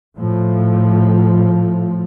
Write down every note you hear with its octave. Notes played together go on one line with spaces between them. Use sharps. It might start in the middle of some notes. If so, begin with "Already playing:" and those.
A2 F3